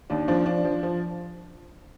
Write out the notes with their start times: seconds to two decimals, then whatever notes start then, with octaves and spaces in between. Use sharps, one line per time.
0.10 D#2 D4
0.28 F3 D4
0.46 F3 D4
0.64 F3
0.83 F3